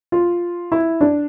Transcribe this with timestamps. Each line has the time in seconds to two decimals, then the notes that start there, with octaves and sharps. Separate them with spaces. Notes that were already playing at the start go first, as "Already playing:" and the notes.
0.12 F4
0.72 E4
1.01 D4